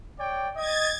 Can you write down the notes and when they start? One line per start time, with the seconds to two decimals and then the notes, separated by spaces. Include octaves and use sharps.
0.19 C#5 D5 G5
0.56 D#5 G#6 A6